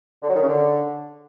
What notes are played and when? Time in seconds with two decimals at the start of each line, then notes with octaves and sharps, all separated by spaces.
0.23 D3
0.29 F#3
0.36 D#3
0.42 C#3
0.48 D3